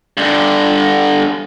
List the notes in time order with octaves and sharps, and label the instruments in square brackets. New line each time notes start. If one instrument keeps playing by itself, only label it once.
[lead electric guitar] G2 D3